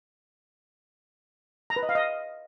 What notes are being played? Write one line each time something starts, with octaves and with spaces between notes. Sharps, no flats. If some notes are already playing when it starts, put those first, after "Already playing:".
A#5
B4
D#5
F5
D#5